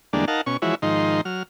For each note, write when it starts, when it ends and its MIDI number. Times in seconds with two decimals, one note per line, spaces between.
0.13 0.25 40
0.13 0.25 50
0.13 0.25 55
0.13 0.25 56
0.13 0.25 58
0.13 0.25 62
0.28 0.41 63
0.28 0.41 70
0.28 0.41 77
0.28 0.41 78
0.28 0.41 81
0.46 0.57 47
0.46 0.57 61
0.46 0.57 85
0.62 0.75 52
0.62 0.75 53
0.62 0.75 56
0.62 0.75 64
0.62 0.75 66
0.62 0.75 73
0.82 1.21 44
0.82 1.21 51
0.82 1.21 53
0.82 1.21 63
0.82 1.21 84
1.25 1.43 54
1.25 1.43 89